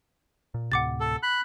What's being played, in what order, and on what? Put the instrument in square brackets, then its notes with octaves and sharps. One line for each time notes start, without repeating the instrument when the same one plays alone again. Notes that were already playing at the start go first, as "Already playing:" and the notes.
[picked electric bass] A#2
[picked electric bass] D2 A2 C3 [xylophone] F#5 D6 A6
[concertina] A4
B5 F#6